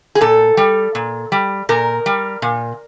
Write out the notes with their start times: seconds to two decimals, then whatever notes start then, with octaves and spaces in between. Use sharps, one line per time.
0.15 G#4
0.21 A#2 A4
0.57 G3
0.95 A#2
1.32 G3
1.69 A#2 A#4
2.06 G3
2.42 A#2